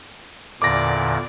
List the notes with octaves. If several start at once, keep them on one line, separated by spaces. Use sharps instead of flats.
E2 A#2 D3 D5 D6 A#6